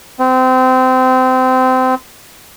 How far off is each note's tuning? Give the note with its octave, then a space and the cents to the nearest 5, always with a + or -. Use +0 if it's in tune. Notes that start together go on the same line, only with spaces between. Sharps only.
C4 -25